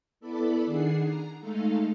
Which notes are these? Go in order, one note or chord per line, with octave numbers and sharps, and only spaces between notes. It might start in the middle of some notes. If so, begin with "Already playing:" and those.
B3 E4 A4 D5 E5 B5
D#3 D4 G#4 F#5 C7
A#5
G#3 A3 D#4 A4 F5